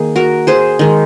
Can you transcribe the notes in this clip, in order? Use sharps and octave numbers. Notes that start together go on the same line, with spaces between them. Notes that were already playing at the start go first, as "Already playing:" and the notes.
Already playing: D#3 A#3 G#4
F#4 A#4
G#4 C5
D#3 G#3